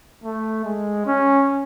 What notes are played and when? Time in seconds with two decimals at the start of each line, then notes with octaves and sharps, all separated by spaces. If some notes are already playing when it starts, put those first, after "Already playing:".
0.24 A3
0.65 G#3
1.06 C#4